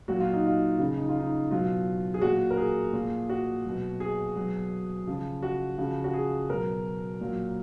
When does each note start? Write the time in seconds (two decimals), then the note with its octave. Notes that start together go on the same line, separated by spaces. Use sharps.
0.08 A#2 F#3 F#4
0.20 F4
0.33 D#4
0.45 F4
0.79 C#3
0.85 F3
0.98 D#4
1.08 F4
1.20 D#4
1.51 B2 F#3 F4
2.14 G#4
2.21 A#2 F#3 F#4
2.51 A#4
2.57 G#4
2.93 A#2 F3
3.29 F#4
3.65 B2 F#3
4.00 G#4
4.36 B2 F#3
5.07 C#3 F3
5.43 F#4
5.78 C#3 F3
6.04 F#4
6.14 G#4
6.49 B2 F#3 A#4
7.21 A#2 F#3